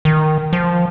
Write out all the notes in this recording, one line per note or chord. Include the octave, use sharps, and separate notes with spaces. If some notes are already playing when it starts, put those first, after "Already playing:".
D#3
F3